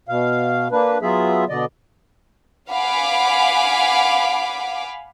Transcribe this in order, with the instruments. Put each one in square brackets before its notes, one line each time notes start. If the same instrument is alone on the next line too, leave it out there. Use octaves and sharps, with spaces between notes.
[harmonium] B2 F5
A#3 D4 B4
F#3 B3 F4 G#4 E5
B2 D3 D5 D#5
[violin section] F5 F#5 G#5 B5 D6